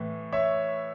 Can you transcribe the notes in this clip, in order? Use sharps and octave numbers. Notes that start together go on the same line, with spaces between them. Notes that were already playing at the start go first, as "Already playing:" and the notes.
Already playing: A2 E3
C#5 E5